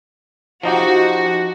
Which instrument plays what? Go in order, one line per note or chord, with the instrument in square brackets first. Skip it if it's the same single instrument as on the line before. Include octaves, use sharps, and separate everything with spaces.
[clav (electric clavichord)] F3 D#4 G4 [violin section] F#4